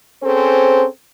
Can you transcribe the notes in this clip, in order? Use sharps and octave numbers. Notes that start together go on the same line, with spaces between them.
C4 C#4 G#4 A4 C5